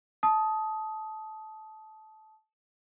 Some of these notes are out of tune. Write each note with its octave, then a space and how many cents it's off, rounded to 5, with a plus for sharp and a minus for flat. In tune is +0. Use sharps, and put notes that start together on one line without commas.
A5 -15 D#6 +10